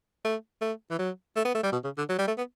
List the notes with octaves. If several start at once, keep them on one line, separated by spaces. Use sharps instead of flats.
A3
A3
E3
F#3
A3
B3
A3
G3
B2
C#3
D3
F#3
G3
A3
B3